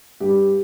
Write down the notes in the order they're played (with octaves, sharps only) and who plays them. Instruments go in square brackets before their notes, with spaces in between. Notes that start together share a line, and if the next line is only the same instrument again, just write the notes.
[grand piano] G2 G4